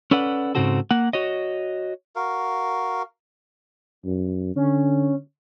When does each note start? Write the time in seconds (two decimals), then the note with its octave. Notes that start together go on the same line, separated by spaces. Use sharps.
0.11 C#4 A4 B4 D5 F#5
0.55 G#2 C#3 C4 F#4 A4
0.91 A#3 F#5
1.13 F#4 C#5 D#5
2.16 F#4 A#4 F5
4.05 F#2
4.56 D3 C#4